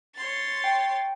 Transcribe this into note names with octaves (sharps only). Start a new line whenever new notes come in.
C#5 C6 A6
G5